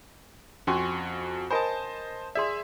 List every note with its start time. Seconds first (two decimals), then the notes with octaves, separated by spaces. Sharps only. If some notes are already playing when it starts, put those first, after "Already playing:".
0.67 F2 C#4 F#4 G#5 C6 C#6
1.51 A#4 C5 D#5 G#5 A5 B5
2.35 G#4 D5 E5 C6